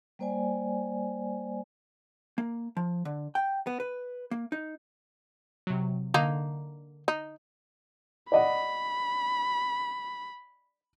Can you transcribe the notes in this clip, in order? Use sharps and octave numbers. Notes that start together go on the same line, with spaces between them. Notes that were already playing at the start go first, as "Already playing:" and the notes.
G3 A#3 C5 D5 G#5
A#3
F3
D3
G5
B3
B4
A#3
D#4
C3 F#3
D3 A#3 D#4
D#4
D5 D#5 F#5 B5